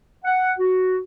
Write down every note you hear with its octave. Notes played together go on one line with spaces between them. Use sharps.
F#5
F#4